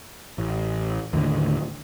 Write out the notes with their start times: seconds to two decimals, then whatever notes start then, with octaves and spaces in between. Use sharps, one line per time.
0.38 A1
1.13 D#2 A2 D3